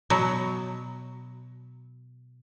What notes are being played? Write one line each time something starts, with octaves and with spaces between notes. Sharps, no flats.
B2 F#3